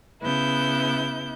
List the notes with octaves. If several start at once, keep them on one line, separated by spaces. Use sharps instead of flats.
C#3 B3 E4 G6